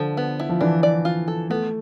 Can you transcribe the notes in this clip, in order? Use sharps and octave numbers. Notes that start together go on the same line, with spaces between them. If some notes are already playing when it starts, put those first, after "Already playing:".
Already playing: D3 F3
B3
E4
F3
E3 D4
D5
F4
A4
A3 B3